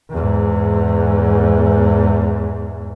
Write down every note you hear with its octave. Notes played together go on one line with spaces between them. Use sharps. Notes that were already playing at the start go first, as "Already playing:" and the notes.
E2 G#2